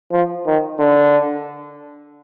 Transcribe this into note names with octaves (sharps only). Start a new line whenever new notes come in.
F3
D#3
D3